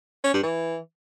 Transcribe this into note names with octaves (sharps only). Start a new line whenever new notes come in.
C#4
G2
E3